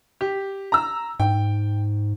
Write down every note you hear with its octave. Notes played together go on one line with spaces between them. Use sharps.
G4
A#5 E6
G#2 G5